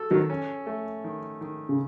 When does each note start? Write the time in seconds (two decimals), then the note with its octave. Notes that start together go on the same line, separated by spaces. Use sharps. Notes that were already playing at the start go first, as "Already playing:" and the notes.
Already playing: F#4 A4
0.11 D#3 F#3
0.30 C#4
0.66 A3
1.04 D#3
1.41 D#3
1.69 C#3